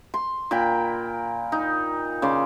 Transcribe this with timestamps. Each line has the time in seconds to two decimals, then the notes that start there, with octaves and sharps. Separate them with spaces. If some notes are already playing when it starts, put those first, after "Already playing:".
0.14 C6
0.51 A#2 A#4 G5 B5
1.52 D#4
2.22 C#3 D5 C6